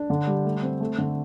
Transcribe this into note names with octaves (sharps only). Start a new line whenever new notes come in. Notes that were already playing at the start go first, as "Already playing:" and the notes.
Already playing: D4
D3
G3
A3
C4
A3
D3